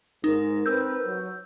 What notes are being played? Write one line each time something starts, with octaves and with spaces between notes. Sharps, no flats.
G#2 D#4 A#4
C4 A#4 B4 E6 G6
F#3